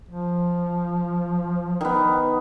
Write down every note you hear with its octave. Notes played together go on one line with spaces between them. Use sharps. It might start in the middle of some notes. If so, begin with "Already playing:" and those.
F3
D#3 B3